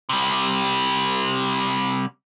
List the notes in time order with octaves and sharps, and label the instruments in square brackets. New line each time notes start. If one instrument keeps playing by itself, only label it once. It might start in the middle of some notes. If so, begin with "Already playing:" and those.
[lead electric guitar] C3 G3